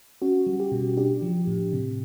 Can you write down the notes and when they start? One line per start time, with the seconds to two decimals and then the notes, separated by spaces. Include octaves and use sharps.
0.22 C#4 F#4
0.47 G3
0.60 G4
0.72 B2
0.97 D4 G4
1.22 F3
1.47 A2
1.72 C3